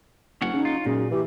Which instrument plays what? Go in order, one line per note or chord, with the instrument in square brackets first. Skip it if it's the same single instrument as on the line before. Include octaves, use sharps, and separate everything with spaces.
[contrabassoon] F#1 [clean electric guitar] C#4 F#5
[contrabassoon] C#3 [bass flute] D#4
[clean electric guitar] F4
[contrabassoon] F#2 [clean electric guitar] A#2 [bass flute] G#4
[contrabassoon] E3 [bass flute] G4